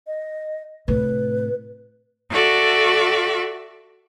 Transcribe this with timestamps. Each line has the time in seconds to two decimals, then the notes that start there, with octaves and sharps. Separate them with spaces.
0.07 D#5
0.88 A2 C3 B4
2.30 F#4 A4 D5 E5